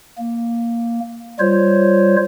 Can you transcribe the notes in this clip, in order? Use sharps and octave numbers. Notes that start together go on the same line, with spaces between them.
A#3
G3 F4 C5 C#5